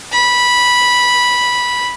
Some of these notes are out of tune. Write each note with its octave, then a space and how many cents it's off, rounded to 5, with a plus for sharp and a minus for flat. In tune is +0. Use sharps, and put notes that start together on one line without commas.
B5 -10